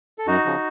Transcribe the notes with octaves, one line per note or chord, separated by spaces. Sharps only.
A4
F#2 D#4 F#4
C#3 F3